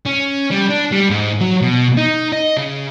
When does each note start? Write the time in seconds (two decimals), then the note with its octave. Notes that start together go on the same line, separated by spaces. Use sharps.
0.06 C#4
0.51 G3
0.69 D4
0.92 G3
1.10 G#2
1.41 F#3
1.61 B2
1.97 D#4
2.32 D#5
2.57 C#3